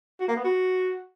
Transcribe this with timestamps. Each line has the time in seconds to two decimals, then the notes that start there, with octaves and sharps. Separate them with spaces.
0.20 F#4
0.28 A#3
0.36 B3
0.44 F#4